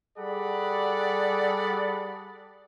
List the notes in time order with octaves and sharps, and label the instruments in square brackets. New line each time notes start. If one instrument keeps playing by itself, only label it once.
[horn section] G3 G#4 A4 D5 F#5 B5